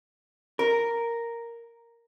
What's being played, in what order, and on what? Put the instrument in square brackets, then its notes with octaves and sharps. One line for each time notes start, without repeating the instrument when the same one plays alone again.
[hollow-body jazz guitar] A#4